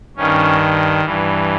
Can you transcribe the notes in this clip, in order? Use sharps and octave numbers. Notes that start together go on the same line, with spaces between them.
G2 D#3 C#4
G2 E3